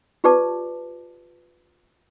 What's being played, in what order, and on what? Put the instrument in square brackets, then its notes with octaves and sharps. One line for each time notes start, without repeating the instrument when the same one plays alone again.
[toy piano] F4 G4 B4 D5 A5 D6